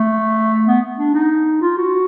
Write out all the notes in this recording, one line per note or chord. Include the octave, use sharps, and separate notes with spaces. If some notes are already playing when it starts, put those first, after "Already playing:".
Already playing: A3
B3
D4
D#4
F4
F#4